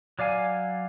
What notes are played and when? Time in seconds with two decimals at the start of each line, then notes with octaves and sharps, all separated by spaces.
0.19 F#3 D5 F5 G#5